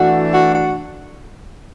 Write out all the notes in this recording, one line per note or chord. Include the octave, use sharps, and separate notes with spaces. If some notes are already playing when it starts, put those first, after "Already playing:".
Already playing: E3 A3 D4 F#4
F#4
F#4